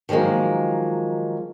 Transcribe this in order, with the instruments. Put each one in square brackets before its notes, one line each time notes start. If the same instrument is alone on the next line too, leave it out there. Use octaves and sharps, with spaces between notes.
[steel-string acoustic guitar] D#3 F3 F#3 G#3 A#3